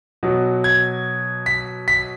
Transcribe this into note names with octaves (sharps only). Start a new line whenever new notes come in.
B2 F#3
G#6
B6
B6